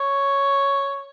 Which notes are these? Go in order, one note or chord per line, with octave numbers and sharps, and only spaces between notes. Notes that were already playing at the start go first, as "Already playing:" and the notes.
Already playing: C#5